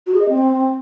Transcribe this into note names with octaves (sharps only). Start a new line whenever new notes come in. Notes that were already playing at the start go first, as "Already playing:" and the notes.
F#4
G#4
D#5
C4